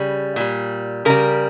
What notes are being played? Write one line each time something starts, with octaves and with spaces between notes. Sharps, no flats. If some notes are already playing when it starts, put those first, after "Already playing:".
Already playing: C#3 G3
A#2 G3
C#3 G3 A#4